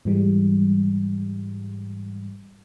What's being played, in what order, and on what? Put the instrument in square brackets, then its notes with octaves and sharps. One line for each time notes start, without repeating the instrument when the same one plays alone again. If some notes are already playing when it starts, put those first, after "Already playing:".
[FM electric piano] G#2 E3 G3 G#3